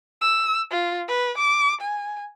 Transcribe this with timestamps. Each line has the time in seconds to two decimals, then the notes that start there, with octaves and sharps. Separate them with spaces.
0.21 E6
0.71 F4
1.08 B4
1.38 D6
1.81 G#5